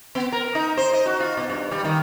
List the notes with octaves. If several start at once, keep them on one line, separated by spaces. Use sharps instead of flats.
B3
A#4
D#4
C5
D#5
F#4
F4
B2
G2
G3
D#3